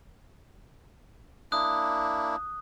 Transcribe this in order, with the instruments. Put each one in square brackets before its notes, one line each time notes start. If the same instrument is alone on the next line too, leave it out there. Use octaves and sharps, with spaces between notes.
[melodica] A#3 D4 E4 [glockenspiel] D#6 F#6